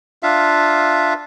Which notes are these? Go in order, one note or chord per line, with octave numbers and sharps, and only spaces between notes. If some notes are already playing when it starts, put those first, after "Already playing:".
D4 F4 E5 F5